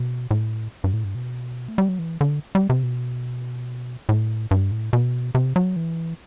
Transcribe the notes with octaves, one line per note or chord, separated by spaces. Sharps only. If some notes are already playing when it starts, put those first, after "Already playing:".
Already playing: B2
A2
G2
A2
G2
B2
A3
G3
F#3
E3
D3
G3
C3
B2
A2
G2
A2
B2
C3
F#3
E3